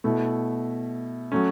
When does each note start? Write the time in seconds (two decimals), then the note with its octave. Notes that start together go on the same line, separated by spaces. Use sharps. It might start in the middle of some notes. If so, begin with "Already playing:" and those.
0.04 B2 A3 E4
1.32 F#3 A3 C#4